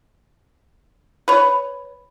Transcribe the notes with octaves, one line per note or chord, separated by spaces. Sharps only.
B4 C#5